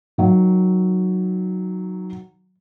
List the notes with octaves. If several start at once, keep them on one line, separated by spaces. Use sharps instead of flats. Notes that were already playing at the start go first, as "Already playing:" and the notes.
D#3 F#3